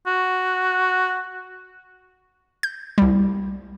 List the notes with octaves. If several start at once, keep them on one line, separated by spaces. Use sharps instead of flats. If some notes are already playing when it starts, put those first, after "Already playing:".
F#4
G6
C2 G3